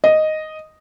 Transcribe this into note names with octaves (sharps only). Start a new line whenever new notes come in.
D#5